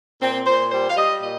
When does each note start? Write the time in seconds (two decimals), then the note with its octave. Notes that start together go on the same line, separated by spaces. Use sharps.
0.20 A#2 C4
0.46 A#2 C5
0.71 G3 C5
0.89 F5
0.96 G3 D#5
1.22 A#2 D#5